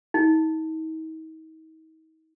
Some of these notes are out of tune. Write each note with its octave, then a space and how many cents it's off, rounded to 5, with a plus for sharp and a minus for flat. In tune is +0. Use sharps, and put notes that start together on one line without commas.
D#4 +40